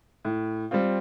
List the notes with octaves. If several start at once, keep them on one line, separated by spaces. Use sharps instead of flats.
A2
G3 C4 F4